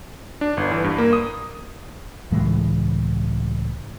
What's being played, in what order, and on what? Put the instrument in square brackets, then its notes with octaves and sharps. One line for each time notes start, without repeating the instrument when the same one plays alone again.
[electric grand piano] D4
G1
E3
G2
A#3
D#6
[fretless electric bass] C#2 A2 E3 G#3